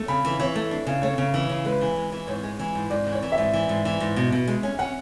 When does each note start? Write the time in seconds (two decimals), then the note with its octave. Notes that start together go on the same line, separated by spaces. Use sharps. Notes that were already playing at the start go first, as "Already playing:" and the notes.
Already playing: A3
0.08 C#3 B5
0.25 E3
0.40 E3 C#5
0.56 A3
0.71 D4
0.87 C#3
1.02 A3 C#5
1.18 C#3
1.34 E3
1.49 C#3
1.65 G#3 B4
1.81 E3
1.96 G#3
2.12 E3
2.27 G#2 C#5
2.43 G#3
2.59 E3
2.75 G#2
2.90 G#2 D5
3.07 E3
3.12 C#5
3.23 E3
3.32 E5
3.38 G#2
3.53 E3
3.69 G#2
3.85 E3
4.00 G#2
4.16 B2
4.32 B2
4.48 G#3
4.63 C#4
4.79 C#4 F#5